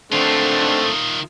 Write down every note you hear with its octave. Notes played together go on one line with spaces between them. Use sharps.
D3 D#3 A3 C4 F4